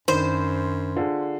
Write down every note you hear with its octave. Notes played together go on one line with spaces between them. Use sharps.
F#2 D#3 D4 C5 B5
D3 F4 G#4